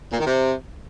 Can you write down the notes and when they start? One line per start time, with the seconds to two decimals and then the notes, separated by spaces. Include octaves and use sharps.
0.12 A#2
0.19 D#3
0.26 C3